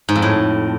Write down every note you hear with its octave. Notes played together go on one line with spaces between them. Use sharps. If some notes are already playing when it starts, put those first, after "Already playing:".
G#2
F2
A2